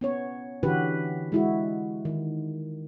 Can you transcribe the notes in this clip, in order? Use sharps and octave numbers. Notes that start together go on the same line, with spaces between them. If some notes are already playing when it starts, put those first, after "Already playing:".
B3 C#4 C#5
D3 E3 C#4 F#4 G4 B4
G#3 E4 F#4
D#3